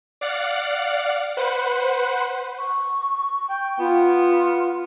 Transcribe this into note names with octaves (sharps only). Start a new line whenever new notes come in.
D5 F5 F#5
B4 C5 F#5
C#6
G5
B3 F4